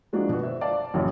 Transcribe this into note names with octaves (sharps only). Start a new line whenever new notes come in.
F3 G#3 A#3 D4 F#4
B2 B3 F#4
C5 E5
D5 F5 A5
A1 F#2 A#2 C#3